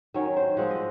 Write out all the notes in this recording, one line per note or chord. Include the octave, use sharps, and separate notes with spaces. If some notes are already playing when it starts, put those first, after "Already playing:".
D#3 F#3 C#4 C#5
C5
F3 G#3 C4 F#5
D#5